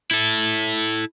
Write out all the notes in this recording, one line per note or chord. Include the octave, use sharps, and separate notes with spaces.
E4 A4